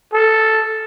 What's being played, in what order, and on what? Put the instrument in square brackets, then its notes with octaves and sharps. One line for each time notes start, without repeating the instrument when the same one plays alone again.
[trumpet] A4